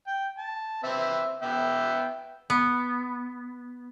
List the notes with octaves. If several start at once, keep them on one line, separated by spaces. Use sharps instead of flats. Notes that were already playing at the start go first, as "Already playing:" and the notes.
G5
A5
C4 B4 E5
B3 E5 G5
B3